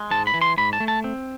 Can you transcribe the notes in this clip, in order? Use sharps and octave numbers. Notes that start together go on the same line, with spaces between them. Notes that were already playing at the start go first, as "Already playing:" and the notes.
Already playing: G#3
G#2 A5
B5
E3
C6
G#2 B5
A5
A3
A5
C4